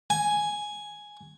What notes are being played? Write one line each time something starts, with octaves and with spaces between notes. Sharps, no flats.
G#5